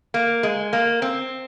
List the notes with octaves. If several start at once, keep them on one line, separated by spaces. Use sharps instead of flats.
A#3
G#3
A#3
C4